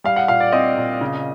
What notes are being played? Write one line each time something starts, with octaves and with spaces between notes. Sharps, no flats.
G3 F5
F#5
A#2 F5
D5
C4 D#5
A#2
C#3